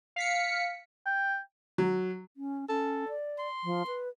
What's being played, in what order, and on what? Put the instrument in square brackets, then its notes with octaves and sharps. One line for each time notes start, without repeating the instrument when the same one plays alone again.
[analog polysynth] F5 B6 C#7
[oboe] G5
[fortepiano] F#3
[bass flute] C#4
[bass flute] C#4 [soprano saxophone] A4
[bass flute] D5
[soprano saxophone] C6
[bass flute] F3
B4